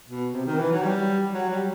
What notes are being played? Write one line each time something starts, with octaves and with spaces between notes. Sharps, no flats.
B2
C3
D#3
E3
F#3
G3
F#3
G3